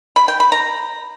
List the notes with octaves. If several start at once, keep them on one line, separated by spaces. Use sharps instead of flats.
B5
G5
B5
A#5